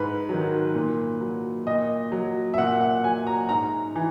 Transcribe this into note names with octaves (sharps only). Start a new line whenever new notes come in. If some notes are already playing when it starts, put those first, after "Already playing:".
Already playing: G#2 B4
D#3 F#3
A#2
F#3
A#2 D#5
F#3
E5
A#2 F#5
F#5
F#3 G#5
A#5
G#2 A#5
E3